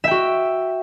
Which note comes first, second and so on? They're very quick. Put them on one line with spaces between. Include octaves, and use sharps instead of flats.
E5 G5 F#4